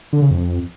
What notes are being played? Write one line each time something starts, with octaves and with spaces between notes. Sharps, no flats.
D3
C#3
F2